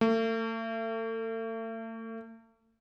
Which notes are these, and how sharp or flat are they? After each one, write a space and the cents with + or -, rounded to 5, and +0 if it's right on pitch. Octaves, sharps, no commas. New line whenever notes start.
A3 +40